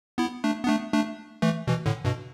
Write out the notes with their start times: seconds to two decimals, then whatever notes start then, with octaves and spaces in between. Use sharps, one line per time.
0.18 B3 E4
0.44 A3 D4
0.64 B3
0.68 A3 D4
0.93 A3 D4
1.42 E3 A3
1.67 B2 E3
1.86 A2 D3
2.05 G2 B2